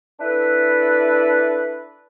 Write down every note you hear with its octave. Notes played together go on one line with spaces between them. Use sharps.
D4 E4 A4 B4